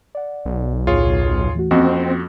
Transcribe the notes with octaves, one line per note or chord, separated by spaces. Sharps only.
D5 F#5
B1
D#2 A2 F4 G#4 C#5
E3 A3 F#4
F2 F3 A#3 C4 C#4 F#4 D#5